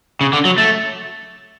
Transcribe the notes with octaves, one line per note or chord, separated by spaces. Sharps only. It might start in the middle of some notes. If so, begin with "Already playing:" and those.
C#3
D3
F#3
A3